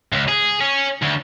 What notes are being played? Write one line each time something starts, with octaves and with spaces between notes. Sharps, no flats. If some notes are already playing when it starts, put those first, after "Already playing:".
C#2
G#4
C#4
D2